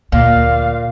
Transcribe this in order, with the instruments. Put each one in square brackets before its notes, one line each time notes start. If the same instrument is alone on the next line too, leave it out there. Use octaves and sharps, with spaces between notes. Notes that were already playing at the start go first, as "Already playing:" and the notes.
[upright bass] D2 [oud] A#2 [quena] F5